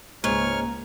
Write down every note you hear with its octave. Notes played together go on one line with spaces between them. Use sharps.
C#2 G#2 A#3 C#5 C#6 F6